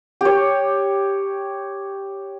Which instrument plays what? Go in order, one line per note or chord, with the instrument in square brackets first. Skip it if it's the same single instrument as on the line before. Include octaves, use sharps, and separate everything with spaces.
[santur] G4 C#5